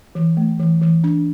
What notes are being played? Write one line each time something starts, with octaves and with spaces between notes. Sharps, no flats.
E3
A3
E3
E3
D4